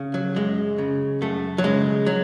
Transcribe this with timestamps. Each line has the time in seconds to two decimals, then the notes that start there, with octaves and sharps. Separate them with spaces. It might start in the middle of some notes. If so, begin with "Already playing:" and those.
Already playing: C#3
0.14 F#3
0.36 F#2 G#3
0.78 C#3
1.21 F#2 A3
1.58 F#3
1.64 C#3 G#3
2.07 F#3